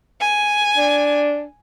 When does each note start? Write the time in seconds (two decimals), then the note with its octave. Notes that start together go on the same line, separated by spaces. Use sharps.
0.21 G#5
0.77 D4